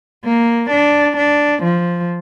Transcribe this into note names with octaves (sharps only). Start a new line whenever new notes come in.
A#3
D4
D4
F3